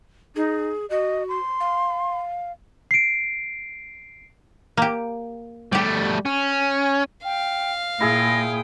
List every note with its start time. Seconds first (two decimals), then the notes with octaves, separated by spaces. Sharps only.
0.36 D#4 G#4
0.90 F#4 D#5
1.28 C6
1.60 F5
2.91 C7 D7
4.77 A#3 G4
5.73 G3 A3 G4 D5
6.26 C#4
7.25 F5 G5
8.01 A#2 E4 G#4 G5 D#6 A#6